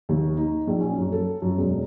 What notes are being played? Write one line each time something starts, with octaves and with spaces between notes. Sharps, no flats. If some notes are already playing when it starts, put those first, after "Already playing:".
D#2
D#4
A#1
C#4
F#2
A4
F#2
E1